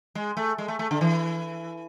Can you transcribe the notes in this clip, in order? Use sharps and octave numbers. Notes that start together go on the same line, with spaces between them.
G#3
A3
G#3
A3
A3
D3
E3